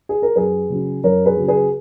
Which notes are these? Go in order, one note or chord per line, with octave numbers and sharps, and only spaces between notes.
G#4
A#4
F#2 G#4 B4
C#3 F#3
F#2 A#4 C#5
G#4 B4
C#3 F#3
G#4 B4